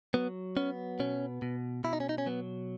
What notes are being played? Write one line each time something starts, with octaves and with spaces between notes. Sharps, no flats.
F#3 B3
B3 C#4
B2 C#4
B2
B2 E4
D#4
C#4
D#4
C#4
F#3 B3